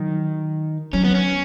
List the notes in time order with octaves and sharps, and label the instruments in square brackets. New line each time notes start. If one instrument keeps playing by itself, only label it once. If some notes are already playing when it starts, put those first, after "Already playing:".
Already playing: [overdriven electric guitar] D#3 [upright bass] F#3
[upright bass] F#3 [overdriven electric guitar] C#4
[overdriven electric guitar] B3
C#4